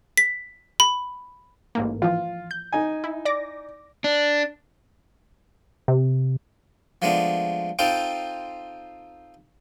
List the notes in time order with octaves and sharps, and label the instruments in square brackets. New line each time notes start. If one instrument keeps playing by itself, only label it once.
[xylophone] B6
B5
[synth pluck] A1 G#2 A#3
[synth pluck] E3 F3 [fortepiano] F4
[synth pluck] G6
[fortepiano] D#4 G#5
[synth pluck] E4
D5 D6 A#6
[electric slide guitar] D4
[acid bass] C3
[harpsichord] F3 G#3 A3 B3 D4 F4
C4 D#4 F4 A4 C5 G5